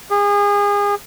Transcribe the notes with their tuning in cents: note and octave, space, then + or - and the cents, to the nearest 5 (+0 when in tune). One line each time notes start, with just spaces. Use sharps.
G#4 -30